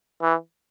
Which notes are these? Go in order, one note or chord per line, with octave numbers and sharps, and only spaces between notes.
E3